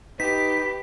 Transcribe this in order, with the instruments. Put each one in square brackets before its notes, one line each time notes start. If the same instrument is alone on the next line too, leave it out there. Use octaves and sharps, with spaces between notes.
[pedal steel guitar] D#4 [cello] G4 [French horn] B4 [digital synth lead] B6